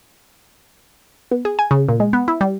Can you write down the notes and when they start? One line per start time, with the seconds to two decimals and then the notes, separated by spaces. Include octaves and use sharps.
1.31 B3
1.45 G#4
1.59 G#5
1.71 C#3
1.89 A#2
2.00 G#3
2.13 B3
2.28 E4
2.41 G3